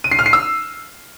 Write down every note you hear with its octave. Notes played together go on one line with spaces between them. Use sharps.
D#7
C7
F6
C7
E6